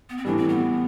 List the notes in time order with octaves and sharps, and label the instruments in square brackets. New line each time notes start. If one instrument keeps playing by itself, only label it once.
[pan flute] B3
C4
[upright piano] A2 E3 G3 [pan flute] D4
[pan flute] C4
B3